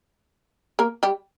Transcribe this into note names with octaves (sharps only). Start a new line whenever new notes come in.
A#3 A#4
G3 G4